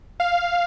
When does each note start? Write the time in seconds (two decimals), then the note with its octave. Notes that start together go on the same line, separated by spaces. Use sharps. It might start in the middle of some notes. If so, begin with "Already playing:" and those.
0.20 F5